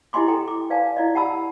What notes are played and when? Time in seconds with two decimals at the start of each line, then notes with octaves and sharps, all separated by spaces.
0.13 E4 G4 D#5 G#5 C6 D6
0.28 A4 G5 A#5
0.48 D6
0.70 B4 D5 F5 G#5 A5
0.97 E4 D5 D#5
1.14 G4 F#5 A5 B5 E6